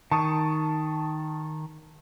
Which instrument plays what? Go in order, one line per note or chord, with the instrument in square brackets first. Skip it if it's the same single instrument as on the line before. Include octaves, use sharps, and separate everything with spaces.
[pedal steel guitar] D#3 [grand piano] A5 C#6 D#6